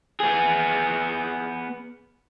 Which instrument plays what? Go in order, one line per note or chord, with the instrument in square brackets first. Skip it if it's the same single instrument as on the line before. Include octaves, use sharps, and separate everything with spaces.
[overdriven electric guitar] B3 G#4